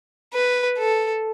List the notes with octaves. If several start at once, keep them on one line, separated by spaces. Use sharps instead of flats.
B4
A4